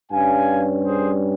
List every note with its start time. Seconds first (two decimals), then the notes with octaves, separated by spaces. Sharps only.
0.12 G2 G3 C#4 F5 G#5
0.85 G#4 C5